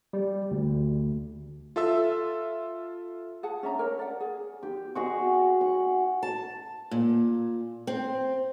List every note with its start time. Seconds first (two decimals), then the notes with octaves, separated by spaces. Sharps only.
0.13 G3
0.51 D2
1.76 F4 A4 E5 E6
3.43 G#4 F#5 A5
3.63 C#4 D4 E5 A#5
3.79 A#4 C#5
3.99 D5 F#5
4.20 G#4
4.63 G4
4.95 F#4 G#4 D#5
5.61 F#5
6.23 A5
6.91 A#2
7.87 C4